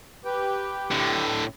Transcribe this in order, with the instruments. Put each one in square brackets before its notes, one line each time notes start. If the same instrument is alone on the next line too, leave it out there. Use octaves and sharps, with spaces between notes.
[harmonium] G4 B4 G5
[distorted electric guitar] A2 D3